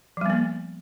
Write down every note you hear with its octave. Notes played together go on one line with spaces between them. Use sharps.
F3 G3 A#3 B3